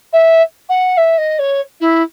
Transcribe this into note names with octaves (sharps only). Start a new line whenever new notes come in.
E5
F#5
E5
D#5
C#5
E4